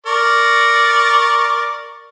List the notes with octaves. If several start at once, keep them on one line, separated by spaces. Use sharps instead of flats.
A#4 D5 C#6